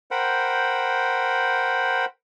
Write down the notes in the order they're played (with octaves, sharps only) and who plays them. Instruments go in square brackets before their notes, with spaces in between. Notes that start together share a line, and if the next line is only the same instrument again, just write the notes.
[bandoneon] A#4 C5 F#5 G5 B5